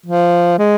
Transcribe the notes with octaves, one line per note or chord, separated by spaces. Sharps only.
F3
G#3